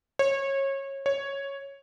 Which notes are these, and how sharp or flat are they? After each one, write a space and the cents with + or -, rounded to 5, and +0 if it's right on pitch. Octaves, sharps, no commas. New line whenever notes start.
C#5 -25
C#5 +0